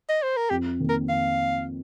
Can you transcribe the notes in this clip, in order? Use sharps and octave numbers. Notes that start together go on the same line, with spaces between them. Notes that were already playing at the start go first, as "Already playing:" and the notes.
D#5
C5
A#4
F2 G4
D#3 A#3
A#4
F2 F5